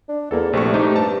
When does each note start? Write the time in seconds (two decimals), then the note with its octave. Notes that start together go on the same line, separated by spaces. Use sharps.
0.09 D4
0.31 E2 A#3 A4
0.53 A#1 C3 A3 C#6
0.74 A3 D#4 G4
0.96 G2 A5